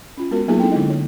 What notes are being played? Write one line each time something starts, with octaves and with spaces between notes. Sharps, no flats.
C#4 F4
G#3 B3 F#4 A#4
F#3 A#3 B3 D#4 F4 G#4
C4 D4 E4 A4 G5
D3 G#3 D#4 F4 D#5
C#5